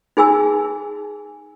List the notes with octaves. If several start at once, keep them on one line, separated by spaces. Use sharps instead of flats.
D#4 G#4 G#5 E6